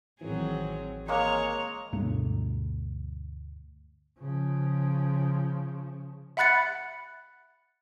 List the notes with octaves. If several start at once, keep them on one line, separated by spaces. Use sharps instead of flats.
A1 D#3 E3 F#3 C4 G#4
G#3 A#3 C#5 A#5
D2 G2 B2 A3
C#3 F3
E5 F#5 B5 F#6 A6 C#7